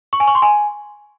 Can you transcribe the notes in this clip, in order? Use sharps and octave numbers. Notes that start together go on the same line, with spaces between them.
C#6
G#5
C#6
C6
G#5